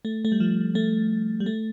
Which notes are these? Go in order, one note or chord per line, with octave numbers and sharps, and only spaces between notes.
A3
A3
G3
F3
A3
G3
A3